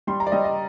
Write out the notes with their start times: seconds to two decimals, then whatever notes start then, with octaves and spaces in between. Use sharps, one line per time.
0.07 G3 C6
0.20 A#5
0.27 D5
0.32 G3 D#5
0.44 D#5